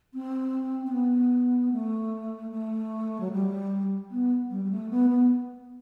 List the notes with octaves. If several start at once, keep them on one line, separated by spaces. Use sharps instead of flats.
C4
C4
B3
A3
A3
F#3
G3
B3
G3
G3
A3
B3
B3